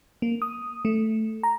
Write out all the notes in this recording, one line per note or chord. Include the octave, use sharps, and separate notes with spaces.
A#3
D#6
A3
A#5